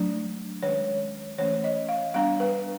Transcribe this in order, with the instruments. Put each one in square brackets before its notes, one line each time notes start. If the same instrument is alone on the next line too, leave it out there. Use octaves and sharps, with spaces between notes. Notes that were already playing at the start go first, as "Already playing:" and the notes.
Already playing: [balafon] F#3 A3 D4
D#3 G#3 C#4 C#5
E3 A3 C#4 C#5
D#5
F5
G3 B3 D4 F5
B4